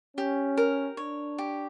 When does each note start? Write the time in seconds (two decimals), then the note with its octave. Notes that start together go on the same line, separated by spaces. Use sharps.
0.17 C#4 G4
0.57 A#4
0.97 D4 C#5
1.38 G4